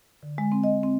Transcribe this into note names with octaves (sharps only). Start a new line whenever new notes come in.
D3
G#3
C4
D#5
C4